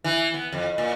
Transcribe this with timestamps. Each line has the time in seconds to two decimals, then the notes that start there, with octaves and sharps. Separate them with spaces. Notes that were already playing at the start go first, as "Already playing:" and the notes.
0.04 E3
0.34 B3
0.52 F2
0.78 A#2